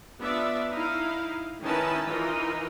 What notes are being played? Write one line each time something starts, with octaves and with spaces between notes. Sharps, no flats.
B3 D4 F4 D5 E5
D#4 E4 F5
D#3 C#4 D#4 E4 B4 A5
E3 D#4 F4 A#4